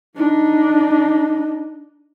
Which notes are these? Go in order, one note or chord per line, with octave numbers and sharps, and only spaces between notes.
D4 D#4